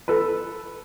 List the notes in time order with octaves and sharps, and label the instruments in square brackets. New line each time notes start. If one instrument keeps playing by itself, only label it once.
[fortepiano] A4 B4